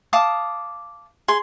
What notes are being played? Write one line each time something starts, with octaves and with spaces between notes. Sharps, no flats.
F5 A5 D6 D#6
G#4 C6